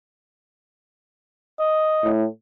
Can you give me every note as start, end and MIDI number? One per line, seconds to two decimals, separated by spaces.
1.59 2.10 75
2.03 2.26 45